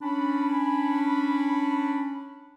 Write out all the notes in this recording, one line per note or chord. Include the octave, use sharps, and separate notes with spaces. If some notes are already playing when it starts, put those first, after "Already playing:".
C#4 D4 B5